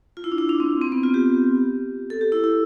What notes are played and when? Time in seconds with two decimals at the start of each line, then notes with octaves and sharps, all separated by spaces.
0.17 F4
0.24 E4
0.32 D4
0.38 E4
0.49 D4
0.60 C4
0.82 C4
0.92 B3
1.03 F4
1.14 G4
2.10 A4
2.21 G4
2.32 E4
2.44 E4